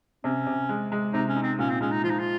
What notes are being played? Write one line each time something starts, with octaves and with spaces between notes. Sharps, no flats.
C3 C#4
C3
G#3
G#3
C3 D#4
C#4
D#4
C4
A#2 C#4
C4
G#3 C#4
D#4
F3 F4
D#4
F4